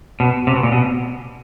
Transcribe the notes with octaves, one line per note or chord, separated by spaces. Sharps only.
B2
C3
B2
A#2
B2